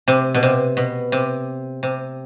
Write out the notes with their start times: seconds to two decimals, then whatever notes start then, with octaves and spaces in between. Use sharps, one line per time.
0.08 C3
0.34 B2
0.43 C3
0.77 B2
1.12 C3
1.83 C3